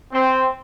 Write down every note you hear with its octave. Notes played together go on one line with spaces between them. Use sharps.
C4